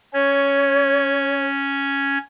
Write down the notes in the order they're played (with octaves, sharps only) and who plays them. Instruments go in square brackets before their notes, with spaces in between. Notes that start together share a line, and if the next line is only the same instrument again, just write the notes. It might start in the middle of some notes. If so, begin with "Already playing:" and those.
[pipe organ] C#4 G#6 [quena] C#5